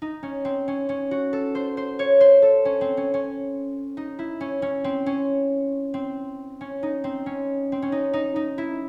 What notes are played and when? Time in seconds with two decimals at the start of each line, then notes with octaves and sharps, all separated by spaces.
0.02 D#4
0.23 C#4
0.45 C4
0.68 C#4
0.89 C#4
1.11 F#4
1.33 A4
1.55 C5
1.77 C5
1.99 C#5
2.20 C5
2.42 A4
2.65 C#4
2.81 C4
2.97 C#4
3.14 C#4
3.97 D#4
4.19 E4
4.41 C#4
4.62 C#4
4.84 C4
5.06 C#4
5.94 C4
6.61 C#4
6.83 D#4
7.04 C4
7.26 C#4
7.72 C4
7.82 C#4
7.92 D#4
8.13 D#4
8.36 D#4
8.58 E4